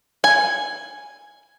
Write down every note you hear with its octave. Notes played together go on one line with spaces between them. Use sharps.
G#5